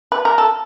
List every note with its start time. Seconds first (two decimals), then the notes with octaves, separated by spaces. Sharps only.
0.12 B4
0.25 A#4
0.38 A4